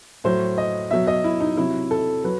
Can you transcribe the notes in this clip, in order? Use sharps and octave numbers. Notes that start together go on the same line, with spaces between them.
A2 F#3 C5
D#5
B2 F#3 E5
D#5
E4
D#4
C3 F#3 E4
A4
F#3 B4